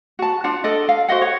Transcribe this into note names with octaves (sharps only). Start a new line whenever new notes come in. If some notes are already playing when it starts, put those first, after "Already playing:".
F#4 A5
D4 F4 F#5
A4 D5 D#5
F5
F#4 C5 D#5 F#5
C#5